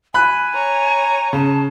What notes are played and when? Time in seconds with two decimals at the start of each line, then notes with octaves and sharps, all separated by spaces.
0.14 G#5 B5 F#6
0.54 C#5 A#5
1.33 C#3 A5